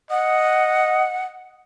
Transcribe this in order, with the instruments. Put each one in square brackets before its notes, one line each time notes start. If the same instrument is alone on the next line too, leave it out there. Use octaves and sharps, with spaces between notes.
[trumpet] D#5 [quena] F#5